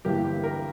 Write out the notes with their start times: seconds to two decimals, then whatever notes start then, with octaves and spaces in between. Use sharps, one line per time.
0.05 G1 G2 E3 A#3 G4
0.44 A#4